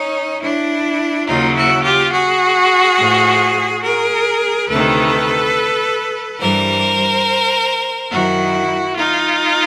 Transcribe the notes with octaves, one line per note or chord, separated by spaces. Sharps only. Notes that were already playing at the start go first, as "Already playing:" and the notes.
Already playing: C#4 D#4
D4 E4
D#2 C#3 F#3 D#4 F4
E4 F#4
F4 G4
F#4 G#4
A2 F3
G#4 A#4
D2 C3 D#3 A4 B4
G2 E3 G3 A#4 C5
F#2 D#3 F#3 E4 F#4
D#4 F4